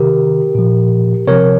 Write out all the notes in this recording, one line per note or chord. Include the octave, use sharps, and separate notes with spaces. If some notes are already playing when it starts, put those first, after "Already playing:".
Already playing: C3 D#3 G4 A#4
A#2 F3
C3 F3 A#4 C#5